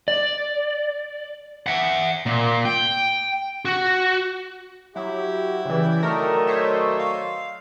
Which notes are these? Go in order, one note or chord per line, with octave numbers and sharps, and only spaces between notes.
D5
E5 F#5
A#2
G5
F#4
F#3 E4 G4
C#3 E3 G4 D5 G5
D#3 F#3 A3 A#4 D5 D#5
C5 C#5 E5
F5